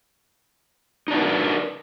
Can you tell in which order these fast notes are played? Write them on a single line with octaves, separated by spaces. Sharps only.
D#4 D4 F#4 B4 A#4